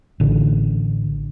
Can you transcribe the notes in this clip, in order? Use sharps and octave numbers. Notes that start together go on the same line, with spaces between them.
A1 D3